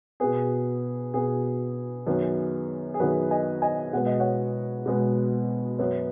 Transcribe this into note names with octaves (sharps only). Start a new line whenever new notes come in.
B2 B3 G#4
B2 B3 G#4
F#2 D#3 B3
G#4
F#2 D#3 B3 F#4 B4
D#5 G#5
D#5 G#5
B2 G#3 B3 F#5
D#5
C#5 F#5
B2 G#3 B3
F#2 F#3 B3